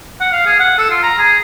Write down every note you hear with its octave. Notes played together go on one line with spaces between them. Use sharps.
F#5
F5
G#4
F#5
A4
F4
A#5
G#4